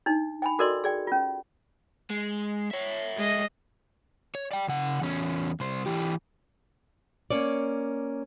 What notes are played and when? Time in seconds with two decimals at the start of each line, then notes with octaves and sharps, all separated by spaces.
0.06 D4 D#4
0.42 G5 G#5 B5
0.59 F#4 A4 A#4 D5 D#5 C6
0.84 G#4 D5 G5
1.07 C#4 F4
2.10 G#3
2.71 C#5 E5
3.17 G#3 D#5
4.35 C#5
4.52 D5 G5
4.68 C#3 F#5
5.01 E2 C#4
5.60 C2 C5
5.86 E3 G4
7.30 A#3 C#4 C#5 D5